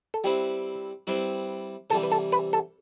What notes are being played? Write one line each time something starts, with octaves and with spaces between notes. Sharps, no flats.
A4
G3 C4 E4 G4 B4
G3 C4 E4 B4
C3 E3 G3 A4
B4
A4
B4
A4